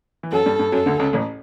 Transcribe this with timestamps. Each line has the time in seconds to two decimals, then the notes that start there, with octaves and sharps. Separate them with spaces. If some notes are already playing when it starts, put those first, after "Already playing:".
0.23 E3
0.32 F#2 F#3 A4
0.46 G2 G3
0.59 G2 G3
0.72 F#2 F#3 A4
0.86 D2 D3
0.99 C#2 C#3
1.13 A1 A2